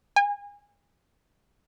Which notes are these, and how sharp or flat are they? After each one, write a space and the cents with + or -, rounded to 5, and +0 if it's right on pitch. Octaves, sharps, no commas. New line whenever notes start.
G#5 -30